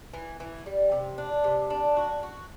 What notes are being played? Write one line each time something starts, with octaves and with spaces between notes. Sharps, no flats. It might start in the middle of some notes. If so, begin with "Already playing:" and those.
E3
E3
G3
C3
D4
C3
D4
F#4
F#4